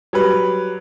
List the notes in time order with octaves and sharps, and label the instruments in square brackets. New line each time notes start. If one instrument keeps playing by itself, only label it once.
[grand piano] F#3 G3 B4